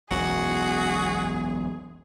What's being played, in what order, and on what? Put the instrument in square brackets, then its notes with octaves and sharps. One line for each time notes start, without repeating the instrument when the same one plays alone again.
[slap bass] E1 B1 F#2 [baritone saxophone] F#4 [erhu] G#4